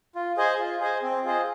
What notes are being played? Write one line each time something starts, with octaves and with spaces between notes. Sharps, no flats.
F4
G#4 C5 D#5 G#5
F4
G#4 C5 D#5 G#5
C4
F4 G#4 C5 D#5